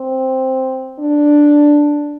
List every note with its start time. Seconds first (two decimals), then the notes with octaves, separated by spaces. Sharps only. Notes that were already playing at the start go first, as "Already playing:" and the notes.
Already playing: C4
0.99 D4